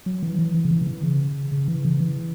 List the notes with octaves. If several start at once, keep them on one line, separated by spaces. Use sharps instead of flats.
F#3
E3
E3
E3
C#3
E3
C#3
E3
C#3
C#3
E3
C#3
E3